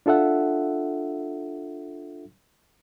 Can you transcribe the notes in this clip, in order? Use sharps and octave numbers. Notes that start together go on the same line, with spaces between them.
D4 F4 A4 E5 F#5